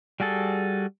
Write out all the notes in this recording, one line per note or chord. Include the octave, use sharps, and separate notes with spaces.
G3 F#4 G#4 A4